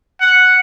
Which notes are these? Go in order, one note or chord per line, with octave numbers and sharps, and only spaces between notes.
F#5